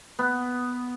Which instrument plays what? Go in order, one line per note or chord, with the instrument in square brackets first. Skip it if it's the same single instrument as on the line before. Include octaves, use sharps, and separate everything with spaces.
[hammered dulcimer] B3